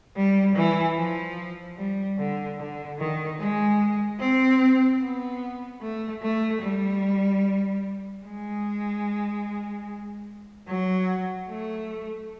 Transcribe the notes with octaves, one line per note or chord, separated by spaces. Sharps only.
G3
E3
F3
G3
D3
D3
D#3
G#3
C4
B3
A3
A3
G3
G#3
F#3
A3